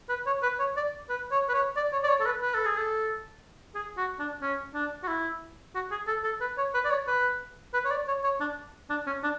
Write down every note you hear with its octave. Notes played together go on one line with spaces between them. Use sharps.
B4
C#5
B4
C#5
D5
B4
C#5
B4
C#5
D5
C#5
D5
C#5
A4
B4
B4
A4
G#4
A4
G#4
F#4
D4
C#4
D4
F#4
E4
F#4
G#4
A4
A4
B4
C#5
B4
D5
C#5
B4
B4
C#5
D5
C#5
C#5
D4
D4
C#4
D4